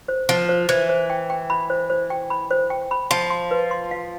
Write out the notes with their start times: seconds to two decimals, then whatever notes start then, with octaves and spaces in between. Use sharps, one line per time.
0.08 C5
0.29 F3 C5
0.49 C5
0.69 E3 C5
0.89 C5
1.10 G5
1.30 G5
1.50 B5
1.70 C5
1.90 C5
2.10 G5
2.30 B5
2.51 C5
2.70 G5
2.91 B5
3.11 F3 C6
3.30 C6
3.51 B4
3.71 C6
3.91 F5